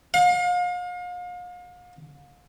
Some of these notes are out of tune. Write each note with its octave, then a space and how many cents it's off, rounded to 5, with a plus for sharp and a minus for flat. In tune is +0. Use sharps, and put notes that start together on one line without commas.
F5 +40